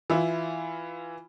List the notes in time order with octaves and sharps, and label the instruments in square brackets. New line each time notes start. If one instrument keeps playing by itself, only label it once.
[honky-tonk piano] E3 E4 F4